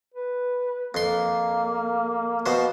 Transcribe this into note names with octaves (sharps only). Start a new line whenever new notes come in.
B4
F2 A#3 C6
B2 F3 C5